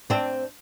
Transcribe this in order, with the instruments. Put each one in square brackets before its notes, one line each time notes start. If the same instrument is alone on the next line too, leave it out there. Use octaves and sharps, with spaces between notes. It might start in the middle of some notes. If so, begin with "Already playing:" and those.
[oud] C4 D4